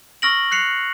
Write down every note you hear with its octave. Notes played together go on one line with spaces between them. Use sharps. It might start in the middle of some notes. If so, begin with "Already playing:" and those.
C#6 E6 F6 A#6 D7 F#7
F#6 C7 C#7 F7